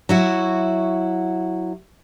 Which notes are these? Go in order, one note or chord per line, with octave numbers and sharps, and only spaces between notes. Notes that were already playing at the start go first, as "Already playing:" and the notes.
F#3 E4 F#4